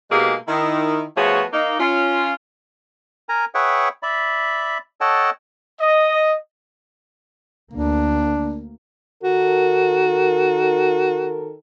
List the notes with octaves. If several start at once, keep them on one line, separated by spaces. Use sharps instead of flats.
B2 G#3 A#3 D#4 G4 G#4
D#3 E4
F3 A3 B3 F#4 G#4 C#5
A#3 D#4
C#4 F4
A#4 G#5 A#5
G#4 B4 C#5 E5 F#5 G5
D5 E5 B5
A4 C#5 D#5 F#5 G5 A5
D#5
D2 A#3 D4
D#3 F#4 A4 A#4